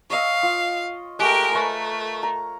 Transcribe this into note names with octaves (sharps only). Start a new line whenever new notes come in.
C#5 D#5 F5 E6
F4
G#3 A3 G4 A#4
A3 A#4 B4 C#5
A#5